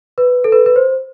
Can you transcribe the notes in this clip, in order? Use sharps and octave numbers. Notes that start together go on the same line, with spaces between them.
B4
A4
B4
B4
C5